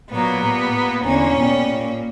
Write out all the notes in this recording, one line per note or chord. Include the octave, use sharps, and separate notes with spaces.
A#2 F#3 A#3 B3
A#2 G3 A#3
A#2 A#3
E2 D3 A#3 C#4
B2 G3 A#3
A#2 A#3